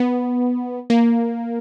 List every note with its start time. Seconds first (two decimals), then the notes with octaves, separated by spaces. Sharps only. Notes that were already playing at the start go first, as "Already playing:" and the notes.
Already playing: B3
0.90 A#3